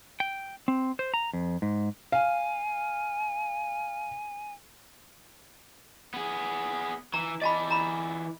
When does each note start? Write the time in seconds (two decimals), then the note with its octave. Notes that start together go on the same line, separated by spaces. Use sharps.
0.20 G5
0.68 C4
0.99 C5
1.14 A#5
1.33 F2
1.62 G#2
2.12 F5 G#5
6.14 B3 G#4
7.14 E3 A#5
7.42 E3 D5 D#5 A5 B5
7.70 A#5 B5